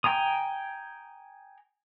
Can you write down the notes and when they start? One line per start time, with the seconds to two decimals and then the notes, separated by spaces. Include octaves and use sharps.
0.04 G5 G#5 A#5 D#6